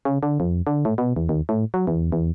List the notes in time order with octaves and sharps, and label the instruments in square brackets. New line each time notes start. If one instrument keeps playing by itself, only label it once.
[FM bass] C#3
D3
F2
D3
A2
B2
E2
D#2
A2
F#3
E2
E2